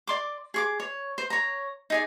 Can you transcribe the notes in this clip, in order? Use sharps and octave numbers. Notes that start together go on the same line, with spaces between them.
D5 C6 D6
G#4 C#6 D6
C#5
C5
C#5 A#5
D#4 G#4 D5